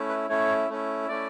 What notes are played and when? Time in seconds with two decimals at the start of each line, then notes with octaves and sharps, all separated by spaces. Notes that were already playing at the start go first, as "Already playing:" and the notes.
Already playing: A3 C#4 E4
0.09 B4
0.29 A3 C#4 E4 C#5
0.69 A3 C#4 E4
1.09 A3 C#4 E4 D5